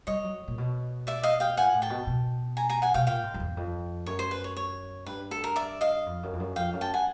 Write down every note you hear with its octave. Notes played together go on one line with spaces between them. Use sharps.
G3 C#5 D#5
F#3
A#2
B2
D5 E5
D#5 F5
F5 G5
A#2 F#5 G#5
A2
G5 A5
B2
B2
G#5 A#5
G#5 A#5
F#5 G#5
B2 F5 G5
A#2 F5 G5
G#2
F2
E2
F2
F#2 C#5
C5
B4
C#5
C#5
G2 B4
A4
A#4
D5 E5
D#5 F5
F2
F#2
F2
F#2
F2 F5 G5
F#2
G5 A5
F#5 G#5